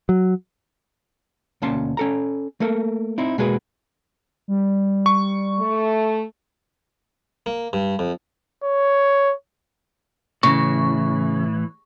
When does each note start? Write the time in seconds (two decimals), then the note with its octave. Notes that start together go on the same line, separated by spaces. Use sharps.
0.09 F#3
1.62 D2 B2 A#3 C#4 A5 C6
1.97 C#4 A4 A#5
2.60 A3 A#3 A4 A#4
3.18 C4 D#4 E4
3.38 B2 G#3 A#3 F#4 G#4 B4
4.48 G3
5.06 C#6
5.59 A3
7.46 A#3
7.73 G2
7.99 F2
8.64 C#5
10.43 A2 C#3 E3 C#6